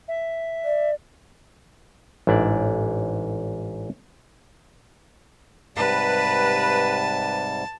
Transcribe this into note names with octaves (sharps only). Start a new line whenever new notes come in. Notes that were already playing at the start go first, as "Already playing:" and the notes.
E5
D5
A1 G#2 D4 E4 D5
G#2 C3 G3 B4 A5